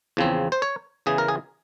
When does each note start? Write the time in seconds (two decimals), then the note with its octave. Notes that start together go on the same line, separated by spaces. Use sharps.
0.17 E2 C#3 F3 C4
0.52 C5
0.62 C#5
1.06 E2 C#3 E3 G#4
1.18 A#4
1.28 G#4